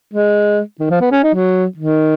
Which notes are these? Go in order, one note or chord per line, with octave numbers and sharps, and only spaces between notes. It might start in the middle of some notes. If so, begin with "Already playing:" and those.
G#3
D#3
F3
B3
C#4
D#4
F#3
D#3